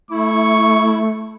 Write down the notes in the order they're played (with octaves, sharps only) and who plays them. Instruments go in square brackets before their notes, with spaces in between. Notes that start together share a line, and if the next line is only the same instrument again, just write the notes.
[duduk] A3 [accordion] E4 [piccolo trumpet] C#6